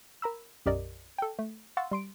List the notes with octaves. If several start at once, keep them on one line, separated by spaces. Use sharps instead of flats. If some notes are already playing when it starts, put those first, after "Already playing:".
A#4 A#5 B5 E6
B1 F#2 G4 A#4 D5 D#5
A4 G5
A3
F5 F#5 C6 C#6 E6 A6
G3 C6 D7